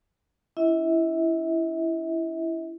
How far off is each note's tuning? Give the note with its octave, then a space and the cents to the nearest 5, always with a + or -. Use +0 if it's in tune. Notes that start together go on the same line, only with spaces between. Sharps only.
C#4 +45 E4 +10 E5 -40